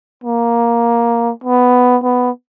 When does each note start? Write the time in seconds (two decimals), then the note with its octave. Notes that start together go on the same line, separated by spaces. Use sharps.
0.24 A#3
1.44 B3
2.03 B3